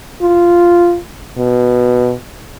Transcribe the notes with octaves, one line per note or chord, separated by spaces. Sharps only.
F4
B2